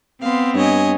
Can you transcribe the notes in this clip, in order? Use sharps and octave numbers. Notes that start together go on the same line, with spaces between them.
B3 C4 F5 C6
G2 C#5 D#5 G#5